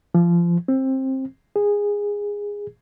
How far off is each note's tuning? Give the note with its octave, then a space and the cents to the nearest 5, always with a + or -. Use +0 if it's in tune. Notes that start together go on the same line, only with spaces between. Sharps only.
F3 -25
C4 +20
G#4 -15